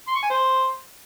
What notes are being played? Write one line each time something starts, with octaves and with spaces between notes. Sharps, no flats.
C6
C#6
G#5
C5